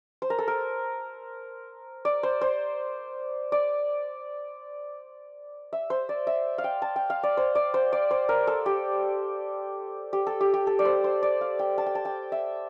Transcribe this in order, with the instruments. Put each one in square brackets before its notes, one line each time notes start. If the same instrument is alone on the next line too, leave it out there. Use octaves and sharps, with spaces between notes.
[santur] C5
A#4
A4
A#4
D5
C5
C5
D5
E5
C5
D5
E5
F5
G5
A5
G5
F5
D5
C5
D5
C5
D5
C5
A#4
A4
G4
G4
A4
G4
G4
A4
D5
C5
C5
D5
F5
G5
A5
G5
A5
G5
E5